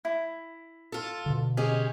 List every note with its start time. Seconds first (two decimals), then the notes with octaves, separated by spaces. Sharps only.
0.05 E4
0.92 F4 A4
1.26 B2 D3
1.57 G#3 C#4 G4 G#4